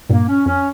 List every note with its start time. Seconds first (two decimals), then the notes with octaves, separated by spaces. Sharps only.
0.09 G2 A#2 A#3
0.28 C#4
0.46 F2 C#4